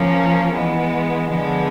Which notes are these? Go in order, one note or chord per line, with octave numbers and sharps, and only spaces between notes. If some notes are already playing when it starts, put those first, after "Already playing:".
Already playing: F3 A#3 C#4
E3 G#3 B3
D3 F3 G#3 B3